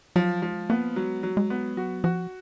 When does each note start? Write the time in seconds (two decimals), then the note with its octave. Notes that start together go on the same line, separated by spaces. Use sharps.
0.16 F3 F#3
0.42 F3 G#3
0.70 A#3 B3
0.96 F#3 G#3
1.23 F#3
1.37 G#3
1.50 B3
1.77 F#3 F#4
2.04 F3 F#4